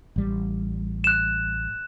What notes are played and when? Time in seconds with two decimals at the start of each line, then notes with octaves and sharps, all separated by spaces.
0.16 A1 G3
1.04 F#6 E7